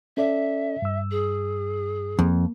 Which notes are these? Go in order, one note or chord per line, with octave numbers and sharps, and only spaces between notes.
C#4 A4 D5 E5
G2 E6
G#4
F2 A#3